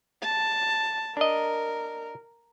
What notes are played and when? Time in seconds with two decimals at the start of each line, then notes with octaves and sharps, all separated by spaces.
0.23 A5
1.17 D4 A#4 D#5